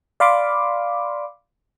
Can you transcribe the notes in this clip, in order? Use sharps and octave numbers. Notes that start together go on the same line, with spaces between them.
D5 F5 B5 C6 D6